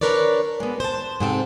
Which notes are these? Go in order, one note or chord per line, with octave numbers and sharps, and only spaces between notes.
D4 A#4 B4 C#5 D5
G#3 B3
C5 A5
G#2 C3 C4 A4